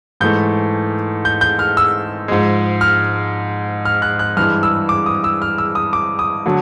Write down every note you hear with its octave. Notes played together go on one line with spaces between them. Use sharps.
G#2 E3 A3 G6
G6
G6
F6
E6
G#2 F3 G#3
F6
F6
F#6
F#6
G2 E3 G#3 F6
E6
D6
D#6
E6
F6
E6
D#6
D6
D#6
D3 F#3 A3